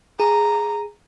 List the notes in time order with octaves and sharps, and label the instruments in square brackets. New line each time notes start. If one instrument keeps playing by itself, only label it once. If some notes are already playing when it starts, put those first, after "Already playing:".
[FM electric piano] G#4 [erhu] A#5